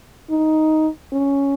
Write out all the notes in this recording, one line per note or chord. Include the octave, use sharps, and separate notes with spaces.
D#4
C#4